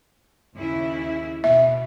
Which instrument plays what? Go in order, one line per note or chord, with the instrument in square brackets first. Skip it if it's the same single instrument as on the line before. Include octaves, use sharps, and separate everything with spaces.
[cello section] D#2 C#3 E4
[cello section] B2 [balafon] E5